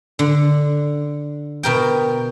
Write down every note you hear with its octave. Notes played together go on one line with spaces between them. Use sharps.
D3
B2 A#4 G5